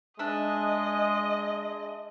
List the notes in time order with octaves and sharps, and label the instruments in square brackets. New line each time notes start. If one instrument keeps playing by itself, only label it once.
[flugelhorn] G#3 [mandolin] D4 E5 [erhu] D#5